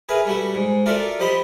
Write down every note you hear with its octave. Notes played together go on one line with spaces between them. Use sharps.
G#4 A#4 B4 E5
G3 A3 F#4
G#2
F4 F#4 A4 A#4 D5 E5
F3 G4 C5 D#5 B5